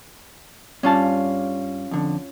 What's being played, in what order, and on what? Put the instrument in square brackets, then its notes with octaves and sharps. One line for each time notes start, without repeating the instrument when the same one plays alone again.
[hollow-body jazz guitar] G2 G3 A5 [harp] C#4 F4
[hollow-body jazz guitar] F2 D3